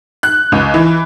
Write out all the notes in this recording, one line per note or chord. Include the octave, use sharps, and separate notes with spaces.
F#6
C#2
E3